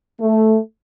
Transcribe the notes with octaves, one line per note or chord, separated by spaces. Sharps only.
A3